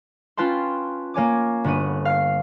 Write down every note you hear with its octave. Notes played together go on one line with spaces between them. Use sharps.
C#4 F4 B4 G5 A5 C6
A#3 C#5 G#5 D6
G1 B3 F#4 D#7
F5 F6 C7